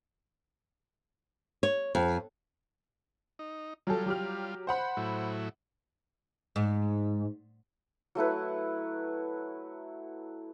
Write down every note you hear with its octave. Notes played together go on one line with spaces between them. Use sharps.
C#5
F2
D#4
F#3 G3 F4 A4
F#3 G4 F6
C5 F#5 B5
A2 F#3 E4
G#2
F#3 A3 E4 B4